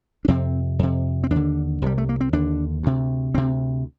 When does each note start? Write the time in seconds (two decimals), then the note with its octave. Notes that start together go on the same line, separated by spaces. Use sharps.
0.25 D4
0.28 F2 C3 C4
0.79 F2 C3
1.24 C4
1.31 D#2 D3 D4
1.82 C2 C3 G3
1.98 A3
2.09 A#3
2.21 C4
2.33 D#2 D3 D4
2.83 D2 C3
3.34 D2 C3 C4